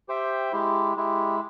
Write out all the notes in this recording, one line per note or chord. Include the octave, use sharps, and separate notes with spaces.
G4 C5 E5 G5
G#3 E4 G4
G#3 E4 G4